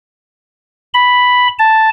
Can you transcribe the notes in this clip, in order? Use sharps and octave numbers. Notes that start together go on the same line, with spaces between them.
B5
A5